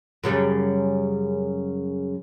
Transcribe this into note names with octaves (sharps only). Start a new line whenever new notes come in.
F#2 C#3 G3